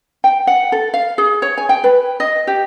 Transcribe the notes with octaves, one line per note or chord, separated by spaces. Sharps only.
G5
F#5
A4
F5
G#4
C#5
G#5
G5
B4
D#5
G4